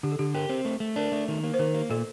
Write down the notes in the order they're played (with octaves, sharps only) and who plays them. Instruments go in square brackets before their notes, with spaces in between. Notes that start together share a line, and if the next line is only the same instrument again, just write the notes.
[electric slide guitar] D3 [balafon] G4
[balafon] A4
[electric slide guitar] D3 [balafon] G4
[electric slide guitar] G4 [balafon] A#4
[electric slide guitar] C4
A3
A3
[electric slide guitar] D4 [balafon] A#4
[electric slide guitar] A3
D#3
A#3
[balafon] C5
[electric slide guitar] D#3 [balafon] A#4
[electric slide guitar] A#3
[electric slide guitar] A#2 [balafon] A4